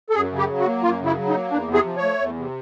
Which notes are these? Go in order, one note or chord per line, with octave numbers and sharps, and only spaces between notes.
A4
F#2 G#4
C#3
G4
F#3
F#4
A#3
F#2 F4
C#3 E4
F#3
D#4
A#3
E2 D4
C3
G#4
F3
C#5
A3
E2
C3